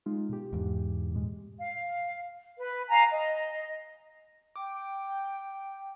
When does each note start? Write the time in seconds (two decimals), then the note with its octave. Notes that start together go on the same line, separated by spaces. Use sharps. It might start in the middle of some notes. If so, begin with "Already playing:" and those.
0.06 G#3 D#4 F4
0.29 B2 G4
0.53 E2 G#2
1.11 A#2 G#3
1.59 F5
2.58 B4
2.90 F5 G#5 A#5
3.11 D#5
4.56 G5 D6